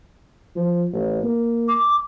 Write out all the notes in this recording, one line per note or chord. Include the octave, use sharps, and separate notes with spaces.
F3
A1
A#3
D6